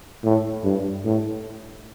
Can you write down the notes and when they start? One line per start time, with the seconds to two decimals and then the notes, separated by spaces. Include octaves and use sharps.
0.24 A2
0.64 G2
1.05 A2